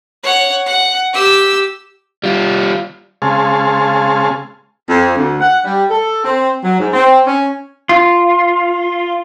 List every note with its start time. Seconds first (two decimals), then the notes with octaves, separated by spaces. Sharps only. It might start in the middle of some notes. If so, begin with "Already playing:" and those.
0.23 C#5 F#5
0.66 F#5
1.13 G4 E6
2.24 G3 F4
3.22 C#3 G#3 C4 G#4 F5 A5
4.88 F2
5.16 D2
5.41 F#5
5.64 G3
5.90 A4
6.24 C4
6.64 F#3
6.79 G#2
6.93 C4
7.26 C#4
7.89 F4